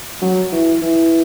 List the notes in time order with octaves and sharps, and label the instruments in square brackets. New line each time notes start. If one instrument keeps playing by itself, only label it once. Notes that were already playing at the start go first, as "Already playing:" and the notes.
[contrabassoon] F#3
E3
E3